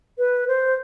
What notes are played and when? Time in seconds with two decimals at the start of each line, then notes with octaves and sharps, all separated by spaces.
0.18 B4
0.48 C5